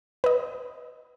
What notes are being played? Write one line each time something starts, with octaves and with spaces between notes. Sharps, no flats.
B4 D#5